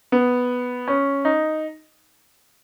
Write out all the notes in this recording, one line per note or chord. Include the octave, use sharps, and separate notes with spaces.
B3
C#4
D#4